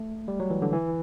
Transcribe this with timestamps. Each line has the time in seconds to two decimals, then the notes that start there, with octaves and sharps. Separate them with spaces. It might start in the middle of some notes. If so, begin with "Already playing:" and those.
Already playing: A3
0.28 G3
0.40 F#3
0.50 E3
0.62 D3
0.73 E3